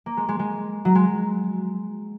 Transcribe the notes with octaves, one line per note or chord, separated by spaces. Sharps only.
A#3
G#3
G#3
G#3
F#3
G#3